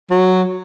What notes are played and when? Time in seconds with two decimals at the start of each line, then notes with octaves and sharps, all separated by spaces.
0.11 F#3